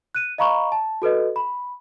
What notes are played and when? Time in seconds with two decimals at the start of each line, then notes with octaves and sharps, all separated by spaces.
0.15 F#6 D#7
0.38 D#5 F5 A#5 B5 C#6
0.72 A5
1.02 F#4 A4 B4 D#5
1.36 B5